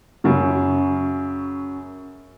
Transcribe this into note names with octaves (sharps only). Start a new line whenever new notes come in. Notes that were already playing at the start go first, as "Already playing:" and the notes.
F#2 C#3